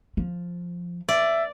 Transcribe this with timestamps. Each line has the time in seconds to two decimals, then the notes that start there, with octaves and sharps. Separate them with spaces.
0.17 F3
1.09 D5 E5